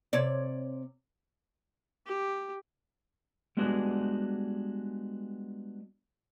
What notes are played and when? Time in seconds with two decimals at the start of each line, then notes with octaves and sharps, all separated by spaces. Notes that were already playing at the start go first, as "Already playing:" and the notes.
0.13 C3 C#5 D5
2.06 G4
3.57 G3 G#3 B3 D4 F#4 G#4